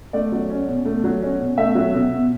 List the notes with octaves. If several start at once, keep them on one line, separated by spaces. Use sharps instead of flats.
A3 D5
F#3
C#4
B2
A3
F#3
C#4
B2
A3 E5
F#3
B2
B2